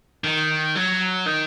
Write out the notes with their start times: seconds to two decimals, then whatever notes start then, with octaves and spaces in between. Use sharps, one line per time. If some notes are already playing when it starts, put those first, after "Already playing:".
0.24 D#3
0.75 F#3
1.26 D#3